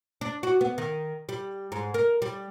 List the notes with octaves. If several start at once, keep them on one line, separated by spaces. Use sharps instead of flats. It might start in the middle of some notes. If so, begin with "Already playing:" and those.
D4
F#4
B3
D#3
G3
G#2
A#4
G3